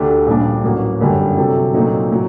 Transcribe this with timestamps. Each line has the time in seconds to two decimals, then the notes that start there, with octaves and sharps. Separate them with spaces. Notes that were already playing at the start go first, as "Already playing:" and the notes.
Already playing: D2 D3 A3 D4 G4
0.26 A#1 A#2 G3 D4
0.63 A1 A2 F#3 A#3
1.00 G1 F#2 D3 G3
1.37 C3 F#3 C4 F#4 A4
1.74 A#2 F#3 A3 C4 D#4
2.11 A2 F#3